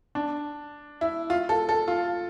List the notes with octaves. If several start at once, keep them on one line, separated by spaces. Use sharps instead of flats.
D4
E4
F4
A4
A4
F4